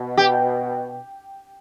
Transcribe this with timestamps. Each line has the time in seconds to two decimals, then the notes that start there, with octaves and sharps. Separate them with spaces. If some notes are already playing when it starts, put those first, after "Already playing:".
Already playing: B2
0.17 G4